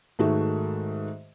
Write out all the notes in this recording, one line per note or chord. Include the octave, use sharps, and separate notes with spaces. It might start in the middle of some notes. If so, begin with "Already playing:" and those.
G#2 D#3 A3 F#4 G#4 E5